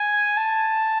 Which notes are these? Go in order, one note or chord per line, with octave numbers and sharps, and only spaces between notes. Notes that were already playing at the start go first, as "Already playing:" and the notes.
Already playing: G#5
A5